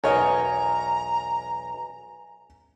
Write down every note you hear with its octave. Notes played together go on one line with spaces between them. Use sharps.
B1 E2 A#4 C#5 D#5 G#5 A#5